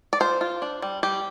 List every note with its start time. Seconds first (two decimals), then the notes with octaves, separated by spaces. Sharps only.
0.13 D5
0.20 F4 C5
0.41 F4
0.62 D4
0.82 G3
1.03 G3 G4